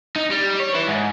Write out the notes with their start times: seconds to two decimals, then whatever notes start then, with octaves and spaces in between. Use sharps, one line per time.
0.16 D#4
0.31 G3
0.60 C#5
0.75 E4 B4
0.87 G#2